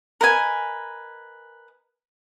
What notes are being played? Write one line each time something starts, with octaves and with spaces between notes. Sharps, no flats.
A#4 B4 D#5 G#5